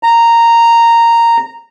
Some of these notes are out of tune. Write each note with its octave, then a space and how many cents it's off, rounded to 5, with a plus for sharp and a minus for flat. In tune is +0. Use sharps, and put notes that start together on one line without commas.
A#5 -10